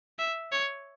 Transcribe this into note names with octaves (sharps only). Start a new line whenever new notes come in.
E5
C#5